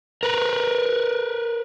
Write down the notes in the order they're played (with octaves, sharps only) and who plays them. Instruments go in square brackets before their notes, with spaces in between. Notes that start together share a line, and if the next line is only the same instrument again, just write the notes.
[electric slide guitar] A#4 B4